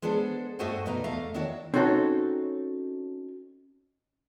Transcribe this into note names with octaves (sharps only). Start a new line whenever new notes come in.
G#3 B3 D4 A4 C5
G2 A3 F#4 C5 D#5 F#5
B2 D#4 B4 D5 A#5
E2 D3 A3 F5 A#5
D#3 D4 E4 F#4 C#5
C4 C#4 D#4 F#4 A4 C#5